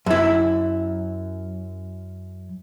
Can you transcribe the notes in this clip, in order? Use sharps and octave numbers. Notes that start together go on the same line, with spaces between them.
F#2 E4